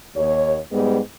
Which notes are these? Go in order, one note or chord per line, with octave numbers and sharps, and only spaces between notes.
D#2 C#5
G#2 G3 G#3 B3